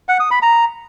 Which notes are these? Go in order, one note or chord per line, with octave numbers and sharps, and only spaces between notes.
F#5
D#6
B5
A#5